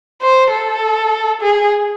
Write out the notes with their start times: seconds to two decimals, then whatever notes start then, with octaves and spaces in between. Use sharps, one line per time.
0.21 C5
0.51 A4
1.41 G#4